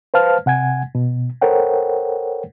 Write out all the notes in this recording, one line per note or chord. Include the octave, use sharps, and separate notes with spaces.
B4 C5 F5 A5 F6
C3 F#5 G#5 G#6
B2
A4 A#4 C5 C#5 F#5 G5